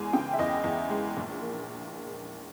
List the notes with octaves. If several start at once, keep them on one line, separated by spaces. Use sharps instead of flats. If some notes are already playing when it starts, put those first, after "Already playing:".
Already playing: E2 G#3 G#5
C#3 G5
E5
E2 D#5
E2
G#3
A#1
A#3